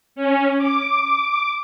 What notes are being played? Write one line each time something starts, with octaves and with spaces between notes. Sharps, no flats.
C#4
D6